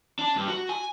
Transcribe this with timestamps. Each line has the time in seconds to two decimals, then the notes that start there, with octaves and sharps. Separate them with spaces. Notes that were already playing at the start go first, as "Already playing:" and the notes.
0.19 D4
0.36 G2
0.48 F#4
0.69 G#5